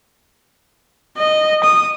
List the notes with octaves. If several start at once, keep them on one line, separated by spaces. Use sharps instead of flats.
D#5
D#6